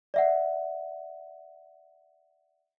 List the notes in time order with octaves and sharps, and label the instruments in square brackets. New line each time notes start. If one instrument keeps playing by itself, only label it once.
[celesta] D5 E5 F#5